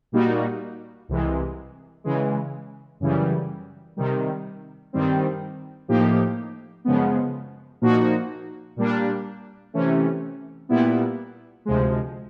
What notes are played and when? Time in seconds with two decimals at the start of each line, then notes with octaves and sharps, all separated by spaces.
0.12 A#2 G3 A#3 D#4 F#4
1.09 C2 C3 E3 G#3
2.04 C#3 E3 G#3
3.00 F#2 C#3 E3 G3
3.97 C3 D#3 G3
4.93 G2 D#3 G3 C4
5.88 A2 F3 A#3 D#4 G4
6.85 F#2 C#3 F3 G#3 B3
7.81 A#2 F3 A#3 D#4 F#4
8.77 A#2 G3 A#3 D4
9.74 C3 E3 A3 C#4
10.69 A#2 G3 B3 E4
11.65 D2 C3 F3 G#3